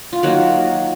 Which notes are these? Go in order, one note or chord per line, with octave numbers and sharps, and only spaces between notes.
F4
D#3 F#3 A#3 F#4